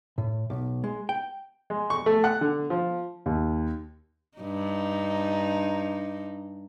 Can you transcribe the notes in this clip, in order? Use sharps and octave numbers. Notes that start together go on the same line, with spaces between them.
A2
B1
G#3
G5
G#3
C#6
A3
F#5
D3
F3
D#2
G2 D#4